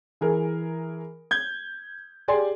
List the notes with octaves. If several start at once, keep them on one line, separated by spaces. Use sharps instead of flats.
E3 G#4 A#4
G6 G#6
G4 G#4 D5 G#5 C6